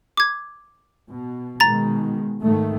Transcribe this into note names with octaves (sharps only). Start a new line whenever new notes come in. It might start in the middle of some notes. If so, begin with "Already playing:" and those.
D6 G#6
B2
B2 D#3 G#3 A#5 A6
G#2 D#3 A3